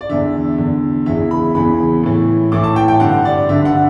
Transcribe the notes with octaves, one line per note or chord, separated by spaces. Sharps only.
D5
E2 D3 E5
E2 D3
E2 C#3 E3 E5
B5
E2 C#3 E3 B5
A2 E3
A2 E3 D6
A5
G5
G5
G2 D3 F#5
D5
G2 D3 E5
F#5